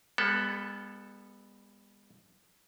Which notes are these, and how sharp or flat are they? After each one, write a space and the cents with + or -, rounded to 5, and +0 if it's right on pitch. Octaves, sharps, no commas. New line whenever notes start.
G#3 -45 B3 +0 A4 +0